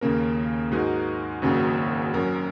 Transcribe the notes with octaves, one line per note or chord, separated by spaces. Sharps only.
D#2 C#3 A#3 C#4 A#4
G#2 G#3 D#4 F#4 A#4
G#1 F#2 C#3 A#3 F#4
F#2 F#3 C#4 A#4